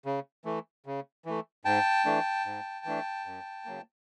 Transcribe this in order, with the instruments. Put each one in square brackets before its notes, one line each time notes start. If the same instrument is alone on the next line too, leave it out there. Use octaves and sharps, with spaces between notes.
[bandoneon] C#3
E3 A3
C#3
E3 A3
G#2 G5 A5
E3 A3 D4
G#2
E3 A3 D4
F#2
C#3 F#3 A#3